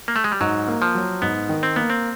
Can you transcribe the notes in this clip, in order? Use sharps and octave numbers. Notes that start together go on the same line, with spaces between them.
A#3
A3
G#3
G3
G#2 F#3
A#3
F3
F#3
G#2 B3
D#3
C4
A#3 B3
C4